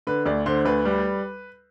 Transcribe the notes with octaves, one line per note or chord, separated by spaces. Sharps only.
D3 B4
D2 D5
D3 C5
D2 B4
G3